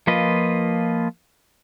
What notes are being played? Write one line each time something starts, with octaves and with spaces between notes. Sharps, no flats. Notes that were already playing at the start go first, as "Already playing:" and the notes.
F3 A#3 F4 B4 D#5